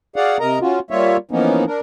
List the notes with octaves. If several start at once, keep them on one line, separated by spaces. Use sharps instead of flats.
F#4 G#4 D5 F5 F#5
C3 A#4 D#5 A#5
C#4 F4 F#4
G3 A#3 F4 C#5 E5
E3 F3 A#3 B3 C#4 D#4
D4 A#4